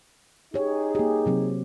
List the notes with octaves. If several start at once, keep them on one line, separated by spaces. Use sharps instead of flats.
D#4 G4 G#4 C#5
A#3 G4
C3 F#3 C4